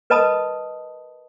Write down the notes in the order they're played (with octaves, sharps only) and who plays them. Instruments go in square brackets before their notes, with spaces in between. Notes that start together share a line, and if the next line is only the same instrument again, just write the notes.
[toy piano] A#4 B4 D#5 A5 B5 D#6